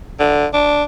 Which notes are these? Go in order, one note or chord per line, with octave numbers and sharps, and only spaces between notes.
D3
D4